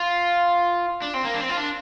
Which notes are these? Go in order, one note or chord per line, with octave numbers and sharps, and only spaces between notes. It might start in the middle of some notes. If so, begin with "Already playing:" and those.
Already playing: F4
D4
C4
A#3
D4
C4
F4
D4